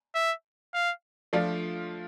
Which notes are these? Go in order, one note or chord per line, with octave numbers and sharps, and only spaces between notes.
E5
F5
F3 A3 D4 F4